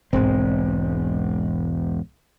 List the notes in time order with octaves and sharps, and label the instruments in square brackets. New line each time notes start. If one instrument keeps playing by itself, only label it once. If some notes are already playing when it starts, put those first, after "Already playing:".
[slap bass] E1 G#3 [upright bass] B1 G#2 [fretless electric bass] C4